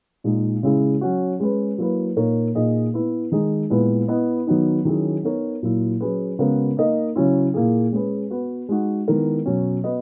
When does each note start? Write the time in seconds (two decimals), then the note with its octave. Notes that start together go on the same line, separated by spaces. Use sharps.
0.24 A#2 G#3 D#4
0.63 C#3 G#3 C#4 E4 G#4
1.01 F#3 C#4 F#4
1.40 G#3 C#4 G#4 B4
1.78 F#3 A#3 E4 B4
2.16 A#2 A#3 D#4 A#4 C#5
2.55 A#2 A#3 D#4 G#4 D#5
2.94 B3 E4 B4
3.32 D#3 G#3 D#4 G#4
3.70 A#2 G#3 B3 E4 B4
4.08 B3 E4 B4 D#5
4.47 D#3 F#3 B3 D#4
4.85 D#3 F#3 C#4 E4 G#4
5.23 B3 D#4 A#4 C#5
5.63 A#2 F#3 A#3 E4
6.01 F#3 C#4 G#4 B4
6.39 C#3 G#3 B3 F#4 A#4
6.77 A#3 D#4 A#4 D#5
7.16 C#3 F#3 C#4 E4
7.54 A#2 A#3 E4 G#4
7.92 G#3 C#4 G#4 B4
8.30 B3 F#4 B4
8.69 G#3 D#4 F#4
9.08 D#3 G#3 B3 E4 A#4
9.46 B2 F#3 C#4
9.84 B3 F#4 B4 D#5